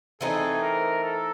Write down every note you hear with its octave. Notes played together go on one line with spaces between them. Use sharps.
E3 A3 C4 D#4 G#4
A#4
A4